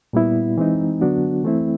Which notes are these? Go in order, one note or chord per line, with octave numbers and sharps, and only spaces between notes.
A#2 G3 B3 E4
E3 G#3 C4 D#4
D3 F#3 B3 D4 F#4
E3 A3 C4 E4